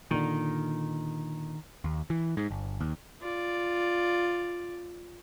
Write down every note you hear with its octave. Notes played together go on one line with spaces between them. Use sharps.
A#2 D3 D#3
D#2
E3
G#2
G1
D#2
F4 D5